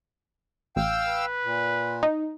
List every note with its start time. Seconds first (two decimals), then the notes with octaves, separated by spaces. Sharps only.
0.76 A1 F5 G5 E6
1.08 B4
1.44 A#2
2.03 D#4